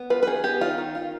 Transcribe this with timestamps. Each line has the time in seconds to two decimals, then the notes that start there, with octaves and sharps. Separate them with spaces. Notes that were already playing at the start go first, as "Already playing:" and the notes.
Already playing: B3
0.10 F4 B4
0.23 B4
0.27 D#3 G#4
0.44 B3 G4
0.61 D#3 F4
0.78 D#3
0.95 F4